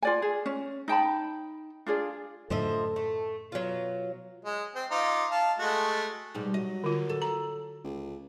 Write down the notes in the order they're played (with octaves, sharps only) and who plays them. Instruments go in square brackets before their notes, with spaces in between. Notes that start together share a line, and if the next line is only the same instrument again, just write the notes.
[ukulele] F4 D5 G#5
G#4
C#4
D#4 G5 A5 B5
D4 F4 G#4 D5
[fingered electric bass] F#2 A2 D3 [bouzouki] F3 D#5 E5 [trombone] A4
[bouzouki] A3
[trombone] B2 [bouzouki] F#3 F4
[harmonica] G#3
C4 C5
D#4 F4 D6
F5 A5
G#3 A3 F#4
[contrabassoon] G#2 [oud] B2 G3
[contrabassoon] F#3 [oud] D#5
[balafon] D3 F4
[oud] A4
[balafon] A#5
[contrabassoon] C#2